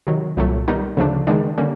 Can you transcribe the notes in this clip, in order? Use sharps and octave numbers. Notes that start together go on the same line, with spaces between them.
C3 D#3 F#3
C2 A#2 F#3 A3
D#3 G3 B3 D#4
D2 C#3 F3 A3 D4
D#3 G#3 B3 D4
D3 G3 A#3 C#4